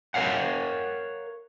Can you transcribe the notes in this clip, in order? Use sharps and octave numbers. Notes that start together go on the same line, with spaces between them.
A#4 C#5 F5 F#5